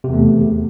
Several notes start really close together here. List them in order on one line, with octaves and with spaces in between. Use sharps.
C3 E2 A3